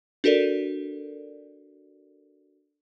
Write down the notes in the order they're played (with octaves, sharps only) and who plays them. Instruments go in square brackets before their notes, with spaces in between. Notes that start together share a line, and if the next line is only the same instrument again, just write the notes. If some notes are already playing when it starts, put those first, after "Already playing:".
[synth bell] D4 F#4 A4 A#4 D5